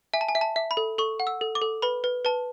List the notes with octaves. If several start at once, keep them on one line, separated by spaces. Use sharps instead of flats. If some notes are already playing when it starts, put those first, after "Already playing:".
E5 G#5
A5
G#5
E5
A5
E5
B5
A4
A4 C#6
F#5
E6
A4
D6
A4
B4 B5
B4
B4 A5